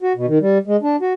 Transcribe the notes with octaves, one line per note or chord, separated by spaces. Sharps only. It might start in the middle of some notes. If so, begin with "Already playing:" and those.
F#4
B2
D#3
G3
G#3
D4
F#4